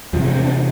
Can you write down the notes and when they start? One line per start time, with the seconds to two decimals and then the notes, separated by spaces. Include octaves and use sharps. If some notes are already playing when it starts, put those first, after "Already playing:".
0.13 E2 C3 F3
0.24 G#3
0.34 C4
0.44 D4